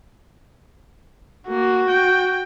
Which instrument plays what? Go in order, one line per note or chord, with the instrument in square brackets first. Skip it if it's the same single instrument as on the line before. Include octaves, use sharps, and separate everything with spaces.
[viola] A#3 [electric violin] F#4
[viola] G5